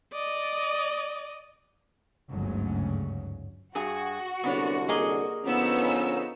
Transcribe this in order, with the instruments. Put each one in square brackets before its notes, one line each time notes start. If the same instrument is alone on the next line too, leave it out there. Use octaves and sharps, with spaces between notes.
[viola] D5 D#5
[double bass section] G1 D2 G#2 C#3 F#3 C#4
[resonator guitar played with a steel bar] G2 G#4 G#5 [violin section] F#4
[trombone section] C2 F#2 D3 [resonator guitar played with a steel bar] B3 D4 C#5
[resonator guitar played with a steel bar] A#3 G#4 D#5
[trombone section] D3 F3 C#4 [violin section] B3 D#4 E6